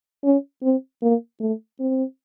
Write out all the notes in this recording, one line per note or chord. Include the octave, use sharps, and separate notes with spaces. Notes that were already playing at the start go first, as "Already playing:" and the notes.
C#4
C4
A#3
A3
C4